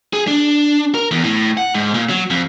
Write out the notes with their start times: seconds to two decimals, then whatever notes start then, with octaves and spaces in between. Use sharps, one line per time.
0.13 G#4
0.28 D4
0.95 A#4
1.11 E2
1.24 A2
1.57 F#5
1.74 G#2
1.94 A#2
2.10 F#3
2.30 F2